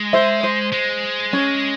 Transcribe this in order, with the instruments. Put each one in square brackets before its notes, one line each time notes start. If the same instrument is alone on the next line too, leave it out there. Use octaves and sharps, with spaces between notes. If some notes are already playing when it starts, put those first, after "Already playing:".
Already playing: [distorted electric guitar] G#3
[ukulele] C5 E5
C5
[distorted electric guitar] G#3
[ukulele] C#4